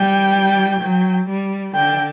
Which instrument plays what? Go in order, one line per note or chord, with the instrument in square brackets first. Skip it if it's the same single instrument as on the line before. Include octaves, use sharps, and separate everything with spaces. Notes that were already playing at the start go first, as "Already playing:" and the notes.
Already playing: [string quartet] G3 [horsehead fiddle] G5
[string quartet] F#3
G3
[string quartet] D3 [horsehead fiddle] G5